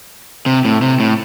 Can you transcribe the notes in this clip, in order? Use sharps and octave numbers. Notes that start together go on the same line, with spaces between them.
C3
A2
C3
A2